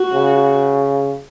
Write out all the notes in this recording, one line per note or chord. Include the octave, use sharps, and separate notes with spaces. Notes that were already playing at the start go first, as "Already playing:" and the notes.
Already playing: F#4
C#3